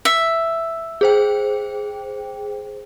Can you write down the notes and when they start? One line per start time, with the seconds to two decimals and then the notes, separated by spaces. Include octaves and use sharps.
0.05 E5
1.01 G#4 C5 G5